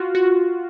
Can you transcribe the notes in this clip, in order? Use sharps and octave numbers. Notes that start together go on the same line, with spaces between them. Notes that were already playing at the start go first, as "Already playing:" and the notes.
Already playing: F4 F#4
F#4